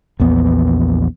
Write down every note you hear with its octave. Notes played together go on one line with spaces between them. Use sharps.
A#1 E2 B3